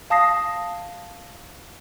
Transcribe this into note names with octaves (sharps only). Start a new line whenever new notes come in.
F5 A5 D#6 A#6 C7